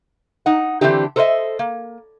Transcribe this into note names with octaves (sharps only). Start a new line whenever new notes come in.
D#4 F#5
D3 E3 C4 D4 D#4 G4
A4 A#4 C5 C#5 D#5 E5
A#3